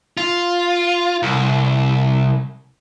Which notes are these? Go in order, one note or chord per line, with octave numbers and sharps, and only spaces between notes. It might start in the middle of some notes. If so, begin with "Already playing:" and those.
F4
C2